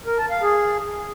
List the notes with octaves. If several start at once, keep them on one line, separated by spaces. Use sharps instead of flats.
A#4
A5
F5
G#4